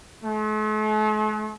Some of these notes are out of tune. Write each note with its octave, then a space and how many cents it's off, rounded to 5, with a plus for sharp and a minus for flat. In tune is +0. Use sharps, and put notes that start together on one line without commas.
A3 -45